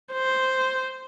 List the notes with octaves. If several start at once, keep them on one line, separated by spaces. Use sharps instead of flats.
C5